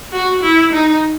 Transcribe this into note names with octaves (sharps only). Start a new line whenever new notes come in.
F#4
E4
D#4